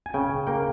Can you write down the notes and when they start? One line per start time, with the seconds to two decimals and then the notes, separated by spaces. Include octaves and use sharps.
0.06 G#5
0.14 C#3 G5
0.47 A#3 G5